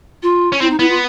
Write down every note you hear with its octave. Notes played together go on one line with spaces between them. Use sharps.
F4
C#4
C4 E4
D#4
B3 E4
F4